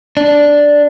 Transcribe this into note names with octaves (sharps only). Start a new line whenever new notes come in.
D4